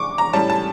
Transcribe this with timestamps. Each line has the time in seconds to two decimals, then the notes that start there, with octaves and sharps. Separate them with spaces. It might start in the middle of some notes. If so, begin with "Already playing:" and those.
Already playing: C#6 D6
0.18 A#5
0.33 A2 G3 C#4 A5
0.50 A5